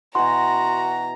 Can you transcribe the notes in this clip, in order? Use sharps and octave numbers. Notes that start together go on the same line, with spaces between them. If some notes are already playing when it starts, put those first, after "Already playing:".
B2 E3 F#4 A#5 C6